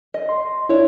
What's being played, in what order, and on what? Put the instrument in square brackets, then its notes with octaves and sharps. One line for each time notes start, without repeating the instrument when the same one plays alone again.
[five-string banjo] D#5
[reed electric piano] C6
[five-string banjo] D4 C#5 [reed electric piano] E4